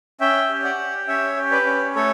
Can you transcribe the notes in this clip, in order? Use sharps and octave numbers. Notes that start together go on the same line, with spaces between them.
C#4 E5 G5
G4
D5 F#5
G4
C#4 C#5 E5
G4
B4 D5
C#4
A3 A4 C#5